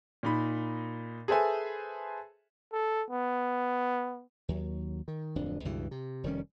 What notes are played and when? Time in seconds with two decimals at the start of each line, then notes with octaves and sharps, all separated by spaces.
0.23 A#2 D#4 B5
1.28 G#4 A4 B4 C5 E5 G#5
2.73 A4
3.10 B3
4.49 D#2 F#3
5.08 D#3
5.35 D1 F2 D4
5.65 C#2 G2 B2 E3
5.91 C3
6.24 F1 D#3 G3 C#4